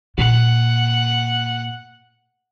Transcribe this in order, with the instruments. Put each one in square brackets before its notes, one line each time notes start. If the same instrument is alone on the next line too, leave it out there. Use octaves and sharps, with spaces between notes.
[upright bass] A#2 [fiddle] F#5